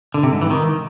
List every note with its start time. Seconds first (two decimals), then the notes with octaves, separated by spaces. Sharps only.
0.14 D3
0.23 C3
0.32 G#2
0.41 E3
0.50 D#3